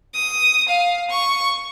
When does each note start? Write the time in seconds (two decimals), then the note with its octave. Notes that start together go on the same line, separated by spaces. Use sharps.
0.14 D#6
0.68 F5
1.10 C#6